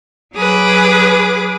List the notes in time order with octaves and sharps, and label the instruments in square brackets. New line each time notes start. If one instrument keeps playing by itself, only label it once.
[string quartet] F#3 G#4 B4 D6 D#6